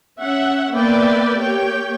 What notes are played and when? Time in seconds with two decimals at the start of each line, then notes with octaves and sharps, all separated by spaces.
0.19 C#4 E5 F#5
0.73 A#3 B3 B4 D5 E5 G5
1.40 A#3 G4 C#5 G5